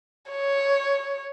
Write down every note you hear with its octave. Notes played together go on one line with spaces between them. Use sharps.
C#5